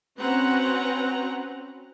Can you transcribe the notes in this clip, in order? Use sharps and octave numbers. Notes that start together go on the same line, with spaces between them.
C4 C#4 F#4 B4 F#5 A#5